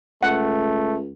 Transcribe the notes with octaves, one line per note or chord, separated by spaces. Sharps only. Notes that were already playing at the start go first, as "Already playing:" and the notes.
C#2 A3 F#5